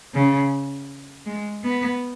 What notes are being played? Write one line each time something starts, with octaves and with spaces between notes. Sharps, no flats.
C#3
G#3
B3